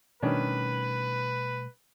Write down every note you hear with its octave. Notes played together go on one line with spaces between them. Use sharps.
B2 D#3 G3 A3 C#4 D4 B4